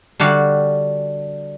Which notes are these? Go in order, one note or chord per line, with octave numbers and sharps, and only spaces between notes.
D3 G3 F#4 F5